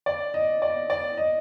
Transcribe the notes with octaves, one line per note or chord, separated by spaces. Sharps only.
D5
D#5
D5
D5
D#5